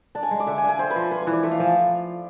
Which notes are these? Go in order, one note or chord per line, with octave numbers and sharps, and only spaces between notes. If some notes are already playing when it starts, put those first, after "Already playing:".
D4 A5
G#5
G#3
D5
D3 E5
G#5
D4
G#5
C4 C5
B4
F3
F4 B4
E3 C5
D5
A3 E5
F5
F3 G#5